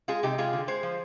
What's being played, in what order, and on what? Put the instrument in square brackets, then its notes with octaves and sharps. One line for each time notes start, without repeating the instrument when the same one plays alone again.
[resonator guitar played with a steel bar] G#3 F4 G#4
C3 D#4 G4
G#3 F4 G#4
D3
G#3 G#4 C5
F3